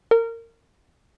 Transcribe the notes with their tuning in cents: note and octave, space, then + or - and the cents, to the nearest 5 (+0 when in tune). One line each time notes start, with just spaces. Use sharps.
A#4 -25